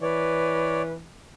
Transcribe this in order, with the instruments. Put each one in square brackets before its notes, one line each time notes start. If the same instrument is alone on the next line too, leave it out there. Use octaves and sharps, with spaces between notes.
[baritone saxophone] E3 [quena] B4 [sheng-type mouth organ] C#5 D5